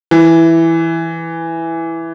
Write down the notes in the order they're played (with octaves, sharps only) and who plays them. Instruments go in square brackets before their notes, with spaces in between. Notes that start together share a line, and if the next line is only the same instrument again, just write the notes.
[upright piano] E3